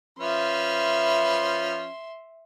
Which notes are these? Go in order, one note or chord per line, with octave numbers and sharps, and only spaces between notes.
F3 C#4 B4 E5 C6